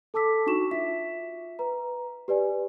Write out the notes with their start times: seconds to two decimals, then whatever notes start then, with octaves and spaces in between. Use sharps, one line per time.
0.14 A4 A5 D6 E6 B6
0.46 D4 D#4 F#4 C#6 E7
0.71 F4 E5 B6
1.59 B4 A#5
2.28 G4 B4 D5 G#5